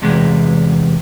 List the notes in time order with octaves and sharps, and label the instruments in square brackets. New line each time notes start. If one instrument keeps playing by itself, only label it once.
[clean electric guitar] E2 C3 G#3